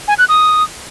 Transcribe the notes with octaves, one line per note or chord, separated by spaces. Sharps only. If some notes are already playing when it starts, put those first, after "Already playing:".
G#5
F#6
D#6